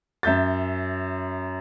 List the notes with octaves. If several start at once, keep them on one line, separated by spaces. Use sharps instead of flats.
F#2 E5 G6 A6